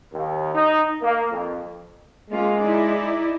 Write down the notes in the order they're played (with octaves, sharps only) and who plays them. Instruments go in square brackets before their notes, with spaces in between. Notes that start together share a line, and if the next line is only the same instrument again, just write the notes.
[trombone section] D#2
D#4
A#3
F2
[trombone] G#3 [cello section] A#3 C#4 F4
[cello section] D#4 E4 D5